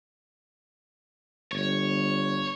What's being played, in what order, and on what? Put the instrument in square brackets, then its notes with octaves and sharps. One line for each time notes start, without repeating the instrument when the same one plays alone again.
[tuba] G1 [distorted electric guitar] C#5